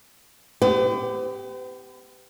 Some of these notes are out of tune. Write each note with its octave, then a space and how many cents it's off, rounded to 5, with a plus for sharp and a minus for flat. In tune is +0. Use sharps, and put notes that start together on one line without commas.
B3 +35 G4 +0 B4 +45